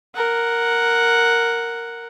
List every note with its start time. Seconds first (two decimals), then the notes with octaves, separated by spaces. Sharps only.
0.15 A#4 F#5